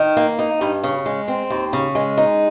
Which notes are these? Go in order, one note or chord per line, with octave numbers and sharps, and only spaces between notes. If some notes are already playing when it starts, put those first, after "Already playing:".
Already playing: D#3
A#3
D#4
G2
C#3
G#3
C4
D#2
C#3
G#3
D#4